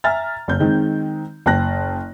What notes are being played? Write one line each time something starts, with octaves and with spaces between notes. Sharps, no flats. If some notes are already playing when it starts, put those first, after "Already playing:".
E5 G#5 A#5 F6 A6
F#1 G6
D#3 G#3 C4 D#4
F#1 G5 A5 F#6 A#6